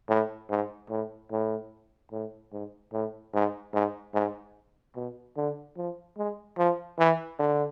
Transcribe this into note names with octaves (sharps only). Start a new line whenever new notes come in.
A2
G#2
A2
A2
A2
G#2
A2
G#2
G#2
G#2
B2
D3
F3
G#3
F3
E3
D3